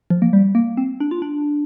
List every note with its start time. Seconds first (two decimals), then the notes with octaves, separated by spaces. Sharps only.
0.10 F3
0.22 A#3
0.33 G3
0.55 A#3
0.77 C4
1.00 D4
1.11 F4
1.22 D4